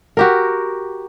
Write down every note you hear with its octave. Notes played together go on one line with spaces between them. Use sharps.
F#4 G4 A#4